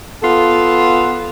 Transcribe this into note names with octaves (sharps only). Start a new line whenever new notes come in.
B3 F4 A4